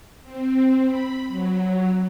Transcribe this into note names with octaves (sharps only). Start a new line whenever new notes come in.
C4
B5
F#3